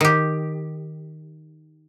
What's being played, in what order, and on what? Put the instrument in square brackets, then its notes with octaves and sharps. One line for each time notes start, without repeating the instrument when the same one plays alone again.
[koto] D#3 G4